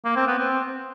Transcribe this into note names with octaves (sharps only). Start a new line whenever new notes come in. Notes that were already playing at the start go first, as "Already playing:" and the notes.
A#3
C4
B3
C4